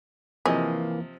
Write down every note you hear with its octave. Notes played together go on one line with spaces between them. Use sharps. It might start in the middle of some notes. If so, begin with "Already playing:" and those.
C3 E3 F3 A#3 G#4 D#5